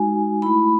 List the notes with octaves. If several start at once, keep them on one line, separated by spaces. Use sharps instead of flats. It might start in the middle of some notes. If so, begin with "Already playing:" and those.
Already playing: G#3 D#4 F#4 G#5
A3 E4 B5